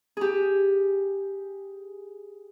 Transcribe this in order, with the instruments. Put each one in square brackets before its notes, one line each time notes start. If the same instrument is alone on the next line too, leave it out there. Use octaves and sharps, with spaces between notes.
[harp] G4 G#4